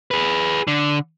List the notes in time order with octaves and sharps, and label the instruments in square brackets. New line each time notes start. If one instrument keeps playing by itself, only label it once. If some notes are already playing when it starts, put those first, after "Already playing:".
[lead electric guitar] G#4 B4
D3